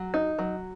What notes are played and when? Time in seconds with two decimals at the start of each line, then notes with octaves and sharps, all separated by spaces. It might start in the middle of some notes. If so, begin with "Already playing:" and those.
Already playing: F#3
0.14 D#4
0.39 F#3